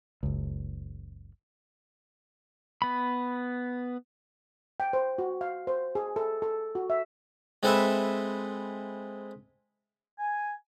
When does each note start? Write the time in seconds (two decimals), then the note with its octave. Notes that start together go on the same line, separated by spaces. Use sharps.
0.23 F#1 C#2
2.82 B3 B5
4.80 G5
4.93 C5
5.18 F#4
5.41 F5
5.67 C5
5.95 G#4
6.16 A4
6.42 A4
6.75 F#4
6.90 E5
7.63 G#3 C4 E4 A4 B4 E5
10.19 G#5